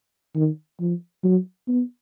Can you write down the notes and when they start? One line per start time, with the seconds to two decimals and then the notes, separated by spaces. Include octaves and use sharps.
0.35 D#3
0.80 F3
1.24 F#3
1.68 B3